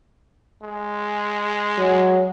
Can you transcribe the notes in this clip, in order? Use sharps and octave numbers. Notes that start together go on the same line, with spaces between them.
G#3
F#3